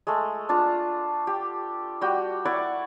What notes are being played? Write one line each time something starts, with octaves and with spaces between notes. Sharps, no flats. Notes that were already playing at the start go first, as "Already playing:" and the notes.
G#3 A3
D4 F4 A5
G4
G3 F#4 G5
E4 D5 F#5 C#6